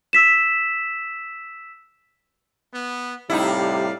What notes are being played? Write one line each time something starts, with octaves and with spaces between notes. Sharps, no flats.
E6 B6 E7
B3
A2 C3 G3 D#4 E4 D5 F5